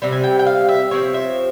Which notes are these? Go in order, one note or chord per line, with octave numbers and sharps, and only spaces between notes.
C3 G3 C4
G#5
G5
G5
F5
E5
C3 F3 C4 C#5
E5